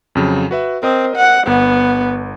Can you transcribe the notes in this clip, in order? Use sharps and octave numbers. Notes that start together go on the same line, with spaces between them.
F2 C#3 F#3
F#4 B4 E5
C4 A#4 D#5 D#6
F#5
G1 B3